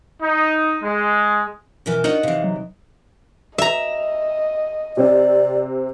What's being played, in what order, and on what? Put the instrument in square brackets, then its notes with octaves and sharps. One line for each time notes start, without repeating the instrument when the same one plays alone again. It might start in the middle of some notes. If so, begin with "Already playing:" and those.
[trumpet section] D#4
G#3
[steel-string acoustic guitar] F#2 B2 E3 [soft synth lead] A#4
[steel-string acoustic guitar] D4 F4 C#5 [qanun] D#4 F#5
[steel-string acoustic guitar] C3 E3 [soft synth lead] F5
[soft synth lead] F#3
[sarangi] D#5 [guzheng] E5 A#5
[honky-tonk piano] C3 C4 [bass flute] D5